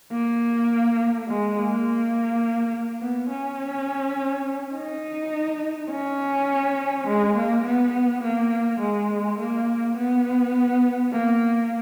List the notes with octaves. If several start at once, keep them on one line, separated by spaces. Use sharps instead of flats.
A#3
G#3
A#3
B3
C#4
D#4
C#4
G#3
A#3
B3
A#3
G#3
A#3
B3
A#3